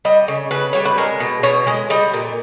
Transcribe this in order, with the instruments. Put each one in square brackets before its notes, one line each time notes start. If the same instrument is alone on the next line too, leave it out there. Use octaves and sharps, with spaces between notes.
[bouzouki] G3 D#5
C#3
C#3 B4
G3 C#5
B4
G#3 A#4
B2
B2 C#5
G#3 D#5
G3 D#5
A#2